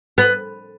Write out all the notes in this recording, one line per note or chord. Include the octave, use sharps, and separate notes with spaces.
B3